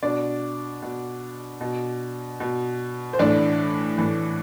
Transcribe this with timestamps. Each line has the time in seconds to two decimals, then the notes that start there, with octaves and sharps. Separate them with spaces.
0.03 B2 D4 D5
0.82 B2
1.61 B2
2.40 B2
3.13 C5
3.19 A2 E3 D4 D5
3.98 A2 E3